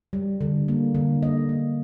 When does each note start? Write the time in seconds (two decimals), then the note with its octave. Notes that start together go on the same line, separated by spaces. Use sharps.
0.13 G3
0.41 D3
0.68 A#3
0.95 D3
1.23 A#3 D#5
1.49 A#3